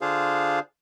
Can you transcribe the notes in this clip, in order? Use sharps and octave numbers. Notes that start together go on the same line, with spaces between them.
D3 D4 F4 G#4 C5 F5